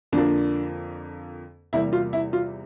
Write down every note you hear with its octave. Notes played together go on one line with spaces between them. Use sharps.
F2 D3 F3 A#3 D4
E2 C3 G3 A#3 E4
F4
E4
F4